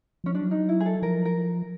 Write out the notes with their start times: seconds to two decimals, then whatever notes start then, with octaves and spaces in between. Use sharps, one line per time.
0.24 F3 C#4
0.35 F#3 D4
0.51 D#4
0.69 E4
0.80 G#4
0.86 A4
1.02 F3 A#4
1.25 A#4